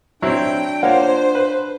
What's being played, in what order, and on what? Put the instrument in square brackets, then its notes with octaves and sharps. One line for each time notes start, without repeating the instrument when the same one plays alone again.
[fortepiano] F#3 C4 E4 [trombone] D4 [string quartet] G5
[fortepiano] A#3 F4 [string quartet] C5 [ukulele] C#5 F#5
[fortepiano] B4